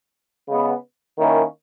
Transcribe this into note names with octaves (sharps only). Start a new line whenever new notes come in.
C#3 G#3 B3
D#3 A#3 C#4 E4